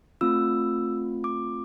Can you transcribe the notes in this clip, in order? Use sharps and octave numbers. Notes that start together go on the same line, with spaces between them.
A3 C4 F4 E6
D6